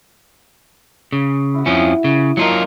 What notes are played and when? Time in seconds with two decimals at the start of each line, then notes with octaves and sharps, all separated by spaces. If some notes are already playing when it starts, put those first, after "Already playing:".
1.12 C#3
1.54 E4 F#4
1.66 F2 F3 C#4
2.04 C#3
2.37 F#3 A#3 D4 D#4 F4 A#4